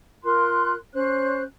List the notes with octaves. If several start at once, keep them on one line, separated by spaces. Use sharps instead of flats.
F4 A#4 C6 F#6
C#4 C5 F#6